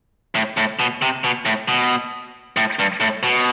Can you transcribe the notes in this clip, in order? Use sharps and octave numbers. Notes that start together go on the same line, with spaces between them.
A2
A2
B2
C3
B2
A2
B2
A2
G2
A2
B2